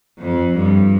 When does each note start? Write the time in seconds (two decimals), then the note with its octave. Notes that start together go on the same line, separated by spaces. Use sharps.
0.22 F2
0.57 G2